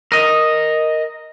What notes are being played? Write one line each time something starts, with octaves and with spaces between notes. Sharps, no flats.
A#4 D#5